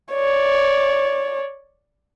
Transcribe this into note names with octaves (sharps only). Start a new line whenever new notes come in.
C#5 D5